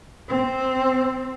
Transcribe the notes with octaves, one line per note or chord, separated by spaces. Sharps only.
C4